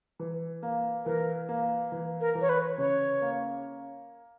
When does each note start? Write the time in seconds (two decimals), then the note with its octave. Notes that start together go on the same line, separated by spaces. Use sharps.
0.20 E3
0.63 A#3
1.05 E3 A#4
1.49 A#3
1.92 E3
2.21 A#4
2.35 E3
2.41 C#5
2.49 B4
2.78 C#3 C#5
3.21 A#3